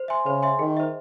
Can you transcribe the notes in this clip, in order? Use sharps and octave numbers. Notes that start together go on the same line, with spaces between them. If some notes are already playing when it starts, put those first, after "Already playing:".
Already playing: C5
E5 G#5 C6
C#3 C5
E5 G#5 C6
D#3 G#4
C5 E5